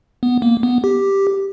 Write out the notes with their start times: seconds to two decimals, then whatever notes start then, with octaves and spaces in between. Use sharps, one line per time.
0.23 B3
0.42 A#3
0.63 B3
0.84 G4